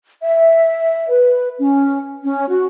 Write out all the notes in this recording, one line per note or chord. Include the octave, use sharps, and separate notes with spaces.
E5
B4
C#4
C#4
F#4